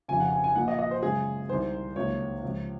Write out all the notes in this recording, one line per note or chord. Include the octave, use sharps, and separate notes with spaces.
F1 F2 C#3 G#5
F#5
G#5
G#5
A#1 A#2 F3 F#5
D#5
D#5
C5
F#2 C#3 G#3 G#4
C2 C3 D#3 C5
C#2 C3 D#3 F#3 A#3 C#5
C#2 C3 F3